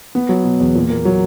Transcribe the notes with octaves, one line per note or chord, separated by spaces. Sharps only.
B3
F#3
B2
E2
A#2
A#3
F#3